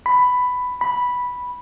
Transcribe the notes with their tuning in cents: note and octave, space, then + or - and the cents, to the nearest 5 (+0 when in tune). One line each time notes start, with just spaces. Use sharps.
B5 +10
B5 -5